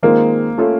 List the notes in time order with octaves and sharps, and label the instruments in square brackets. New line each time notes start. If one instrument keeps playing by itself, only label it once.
[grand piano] D#3 G#3 C4 F4 A#4 [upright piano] A#3
[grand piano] A3 C#4 F4 A4